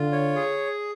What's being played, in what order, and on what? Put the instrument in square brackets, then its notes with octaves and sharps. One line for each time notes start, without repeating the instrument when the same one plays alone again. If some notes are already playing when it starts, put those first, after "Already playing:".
Already playing: [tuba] D3 [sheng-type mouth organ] F4
[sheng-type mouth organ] C#5
G#4